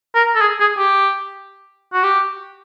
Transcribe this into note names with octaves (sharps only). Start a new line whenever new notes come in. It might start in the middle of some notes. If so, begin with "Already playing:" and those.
A#4
A4
G#4
G#4
G4
F#4
G4